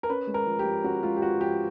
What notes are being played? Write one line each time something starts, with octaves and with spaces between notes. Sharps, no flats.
A#4
C#4 B4
G#3
A#4
F3
G4
F3
C#4 F#4
G#3 F4
G4
F3 F#4
F3 G4